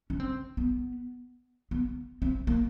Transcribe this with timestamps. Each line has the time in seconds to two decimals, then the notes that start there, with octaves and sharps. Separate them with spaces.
0.10 C#4
0.20 C4
0.57 B3
1.71 B3
2.22 C4
2.47 A#3